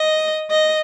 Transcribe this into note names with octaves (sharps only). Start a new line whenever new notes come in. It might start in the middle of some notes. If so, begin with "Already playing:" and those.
Already playing: D#5
D#5